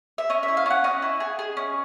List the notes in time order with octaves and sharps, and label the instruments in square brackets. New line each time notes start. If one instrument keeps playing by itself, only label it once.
[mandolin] E5
C#4 D#5
E5
E4
F5
C#4 F#5
C#4 D#5
E4
G#4
G#4
C#4